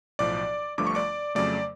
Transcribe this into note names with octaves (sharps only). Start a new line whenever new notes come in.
B1 A2 F3 D5 D6
G1 G2 D3 F3 A3 D6
C#6
D5 D6
F2 C#3 F#3 A3 D5 D6